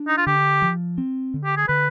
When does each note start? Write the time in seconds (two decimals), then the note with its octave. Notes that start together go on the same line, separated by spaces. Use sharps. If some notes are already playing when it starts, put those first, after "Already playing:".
Already playing: D4
0.08 D#4
0.18 F4
0.27 D3 G4
0.62 F3
0.98 C4
1.34 D3
1.45 G4
1.57 G#4
1.68 D3 B4